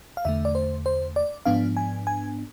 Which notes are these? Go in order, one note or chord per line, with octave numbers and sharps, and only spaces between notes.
F5
E2 D3 A3 E5
D5
C5
C5
D5
G#2 F3 B3 D4 F5
G#5
G#5